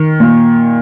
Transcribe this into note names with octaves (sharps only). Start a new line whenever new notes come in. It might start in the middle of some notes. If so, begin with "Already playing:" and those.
Already playing: D#3
A#2